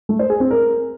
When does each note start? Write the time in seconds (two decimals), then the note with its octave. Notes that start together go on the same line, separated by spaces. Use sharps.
0.09 A3
0.19 C5
0.30 G#4
0.40 C4
0.51 A#4